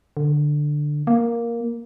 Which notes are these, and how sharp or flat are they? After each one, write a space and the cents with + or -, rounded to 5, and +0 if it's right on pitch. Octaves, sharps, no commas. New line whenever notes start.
D3 +10
A#3 +5